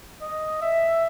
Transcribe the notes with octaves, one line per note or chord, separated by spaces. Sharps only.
D#5
E5